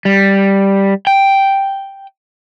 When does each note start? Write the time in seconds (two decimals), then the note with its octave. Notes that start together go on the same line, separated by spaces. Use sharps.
0.05 G3
1.07 G5